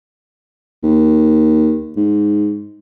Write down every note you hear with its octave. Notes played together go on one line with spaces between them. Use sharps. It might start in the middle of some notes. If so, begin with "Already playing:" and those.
D#2
G#2